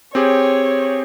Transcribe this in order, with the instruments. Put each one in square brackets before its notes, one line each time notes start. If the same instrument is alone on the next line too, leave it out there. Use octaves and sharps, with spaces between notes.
[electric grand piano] C4 G4 G#4 [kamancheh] C#5